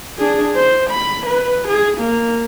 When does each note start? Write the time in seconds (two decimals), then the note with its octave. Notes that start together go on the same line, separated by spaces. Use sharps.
0.19 D4 G#4
0.56 C5
0.91 B5
1.27 B4
1.68 G#4
1.98 A#3